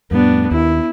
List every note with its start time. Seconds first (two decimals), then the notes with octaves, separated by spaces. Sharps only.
0.11 F2 A2 G3 B3 D4
0.51 D#2 E4